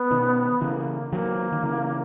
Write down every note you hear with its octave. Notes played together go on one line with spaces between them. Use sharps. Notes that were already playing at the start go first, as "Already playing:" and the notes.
Already playing: B3
B2 D#3
C#3 E3 A#3
D#3 F#3 A#3
D#3
C#3 E3